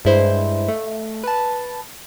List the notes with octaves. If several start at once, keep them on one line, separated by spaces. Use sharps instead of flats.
G2 G#3 E4 C5
A3
B4 A5